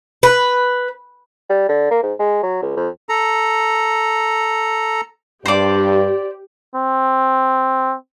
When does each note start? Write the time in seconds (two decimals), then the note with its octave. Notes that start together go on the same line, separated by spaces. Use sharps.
0.23 B4
1.50 G3
1.69 D3
1.91 A#3
2.03 G#2
2.20 G#3
2.43 F#3
2.62 C#2
2.76 F2
3.09 A4 A#5
5.46 G2 G4 C5 D5
6.75 C4